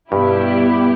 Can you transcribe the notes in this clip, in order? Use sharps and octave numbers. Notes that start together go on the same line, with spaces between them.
G2 B2 G3 B3 E4 G4